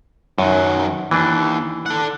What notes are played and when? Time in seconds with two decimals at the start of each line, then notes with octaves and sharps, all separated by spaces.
0.38 F#2 D#3 F#3
1.11 D#2 E3 D4
1.86 A4 F#5